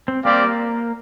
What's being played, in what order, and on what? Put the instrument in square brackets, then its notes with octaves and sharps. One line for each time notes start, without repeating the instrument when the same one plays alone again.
[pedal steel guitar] C4
[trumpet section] G3 C4 G4 D5 F5 [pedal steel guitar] A#3